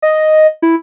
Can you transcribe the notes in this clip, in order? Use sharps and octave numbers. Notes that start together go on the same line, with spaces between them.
D#5
E4